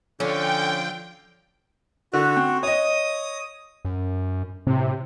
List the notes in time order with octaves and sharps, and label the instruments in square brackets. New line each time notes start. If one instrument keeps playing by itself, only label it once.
[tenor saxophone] D3 [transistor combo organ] F3 [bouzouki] C#4 [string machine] G5
[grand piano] D3 [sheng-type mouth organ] F#4
[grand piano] C4
[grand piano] C#5 D#5 [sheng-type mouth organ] D#6
[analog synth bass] F#2
[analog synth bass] A2 [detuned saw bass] C3